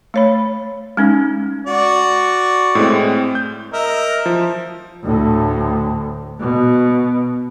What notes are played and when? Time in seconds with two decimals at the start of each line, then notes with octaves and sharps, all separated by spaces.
0.14 A3 C#5 B5
0.97 G#3 C#4 D#4
1.67 F#4 D5 C#6
2.75 A2 G#3 C4
3.35 G6
3.73 A#4 D#5 E5
4.26 F3
5.03 D2 A2
6.40 B2